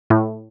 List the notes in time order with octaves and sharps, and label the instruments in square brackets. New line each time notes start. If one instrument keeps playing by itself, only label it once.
[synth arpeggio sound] A2